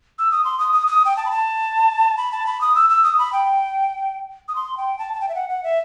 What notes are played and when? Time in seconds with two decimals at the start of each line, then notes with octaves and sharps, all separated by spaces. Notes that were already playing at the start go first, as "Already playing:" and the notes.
0.19 E6
0.31 D#6
0.44 C6
0.59 D#6
0.73 D#6
0.87 D#6
1.05 G5
1.17 A5
1.26 B5
1.30 A5
2.17 B5
2.32 A5
2.46 B5
2.61 D#6
2.75 E6
2.90 E6
3.04 D#6
3.18 B5
3.33 G5
4.48 D#6
4.56 C6
4.77 G5
4.99 A5
5.14 A5
5.21 G5
5.29 E5
5.35 F#5
5.50 F#5
5.63 E5